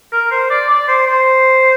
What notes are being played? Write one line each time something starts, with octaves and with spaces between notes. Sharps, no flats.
A#4
C5
D5
D5
C5
C5